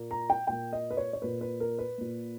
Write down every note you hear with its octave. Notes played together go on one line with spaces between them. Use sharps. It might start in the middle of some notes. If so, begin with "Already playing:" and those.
Already playing: A#2 A#3
A#5
G5
A#2 A#3 G5
D#5
B4
C#5
C#5
A#2 A#3 B4
B4
A#4
B4
A#2 A#3